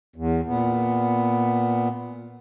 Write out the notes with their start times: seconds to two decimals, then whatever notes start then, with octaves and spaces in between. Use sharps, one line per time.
0.16 E2
0.46 A#2 B3